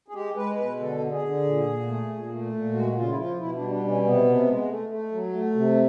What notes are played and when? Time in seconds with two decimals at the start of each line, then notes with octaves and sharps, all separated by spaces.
0.08 G#4
0.14 G#3 G4
0.36 G#3 B4
0.58 B2 B4
0.80 D3 A4
1.01 D3
1.11 G#4
1.22 D3
1.45 A#2
1.66 A#2
1.87 A3
2.09 A#2
2.31 A3
2.52 A#2
2.73 G#3 F#4
2.95 C#3 F4
3.09 E4
3.17 F3 F4
3.39 B2 E4
3.55 D4
3.61 G3
3.71 D4
3.82 B2
3.88 C#4
4.03 C3 B3
4.24 C3
4.46 G#3
4.68 A3
4.90 A3
5.12 F#3
5.33 A3
5.55 C3